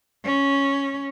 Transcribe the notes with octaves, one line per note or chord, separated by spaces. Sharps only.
C#4